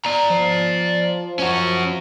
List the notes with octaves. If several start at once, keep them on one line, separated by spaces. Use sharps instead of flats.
D5 A#5
F3
C#4 F#4